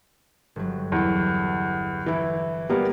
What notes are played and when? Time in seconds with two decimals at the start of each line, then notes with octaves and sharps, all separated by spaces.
0.56 G1 F#3
0.92 E2
2.06 E3 E4
2.70 G3 A#3 B3